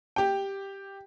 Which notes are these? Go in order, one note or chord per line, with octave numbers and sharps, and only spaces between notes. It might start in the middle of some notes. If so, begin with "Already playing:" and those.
G4 G5